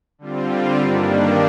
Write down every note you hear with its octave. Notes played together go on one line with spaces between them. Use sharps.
D3 G3 C4 F4
G2 D#3 G3 A#3 D4